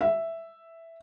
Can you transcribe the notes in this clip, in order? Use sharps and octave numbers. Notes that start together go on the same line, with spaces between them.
E5